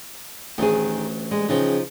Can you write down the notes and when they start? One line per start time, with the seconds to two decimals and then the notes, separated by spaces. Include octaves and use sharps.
0.58 A1 D2 D#3 E3 G#4
1.31 G3 G#3
1.49 C#3 E3 F3 D#4 G5